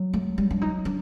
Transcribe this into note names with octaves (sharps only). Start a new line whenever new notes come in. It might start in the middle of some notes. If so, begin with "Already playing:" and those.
Already playing: F#3
A3
G3
D4
D#4
D4